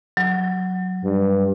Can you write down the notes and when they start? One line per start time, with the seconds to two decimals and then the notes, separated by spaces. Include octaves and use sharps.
0.17 F#3
1.04 G2